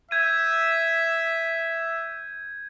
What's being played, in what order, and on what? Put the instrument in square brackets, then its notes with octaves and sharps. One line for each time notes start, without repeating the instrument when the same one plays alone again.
[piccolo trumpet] E5 [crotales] G6 G#6 D#7